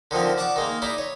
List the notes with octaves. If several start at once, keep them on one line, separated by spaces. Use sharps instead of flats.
D3 D#3 F3 C4
D5 F#5 A5 C#6 D6
D#3 G#3 A#3
D#4 E4 D5
C#5